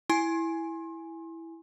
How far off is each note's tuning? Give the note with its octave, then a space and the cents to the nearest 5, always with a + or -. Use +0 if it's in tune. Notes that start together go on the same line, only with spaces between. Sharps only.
E4 +0 G#5 +0 C6 +35